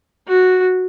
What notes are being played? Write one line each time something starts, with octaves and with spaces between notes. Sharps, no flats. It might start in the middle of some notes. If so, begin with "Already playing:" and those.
F#4